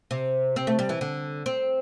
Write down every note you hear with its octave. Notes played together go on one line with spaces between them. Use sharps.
C3
C4
A3
G3
E3
D3
C4